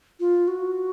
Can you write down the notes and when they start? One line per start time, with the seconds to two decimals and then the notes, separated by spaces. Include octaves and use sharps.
0.20 F4
0.48 F#4